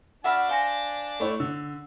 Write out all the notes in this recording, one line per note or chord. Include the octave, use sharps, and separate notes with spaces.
D4 F#4 E5 F#5 A5 B5 F6
C5 F5 G#5 A#6
A3 E4 C#5
D3 E6